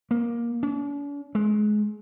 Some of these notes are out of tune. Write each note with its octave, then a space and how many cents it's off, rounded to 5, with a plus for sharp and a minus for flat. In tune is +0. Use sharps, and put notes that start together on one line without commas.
A#3 +15
D4 -45
G#3 +25